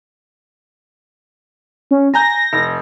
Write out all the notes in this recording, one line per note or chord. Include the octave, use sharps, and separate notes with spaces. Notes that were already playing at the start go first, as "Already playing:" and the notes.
C#4
G#5 A#5 G6 A#6
F1